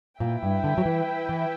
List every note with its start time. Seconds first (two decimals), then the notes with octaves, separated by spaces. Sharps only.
0.20 A#2 E4 B4 E5 G5
0.43 G2
0.64 D3
0.78 F#3
0.85 E3
1.29 E3